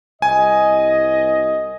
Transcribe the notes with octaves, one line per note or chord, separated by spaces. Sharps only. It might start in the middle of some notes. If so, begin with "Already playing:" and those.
C2 D#5 G#5